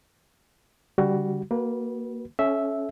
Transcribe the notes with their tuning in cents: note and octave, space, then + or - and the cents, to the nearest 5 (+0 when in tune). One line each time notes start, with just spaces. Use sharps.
D3 -30 G3 +0 F#4 +15
A#3 +0 F#4 +15 B4 -25
C#4 +0 A4 -40 E5 -5